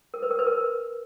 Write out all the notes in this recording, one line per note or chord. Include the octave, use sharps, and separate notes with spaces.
A#4
B4
A#4
B4
A#4